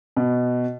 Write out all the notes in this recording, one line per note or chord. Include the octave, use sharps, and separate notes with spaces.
B2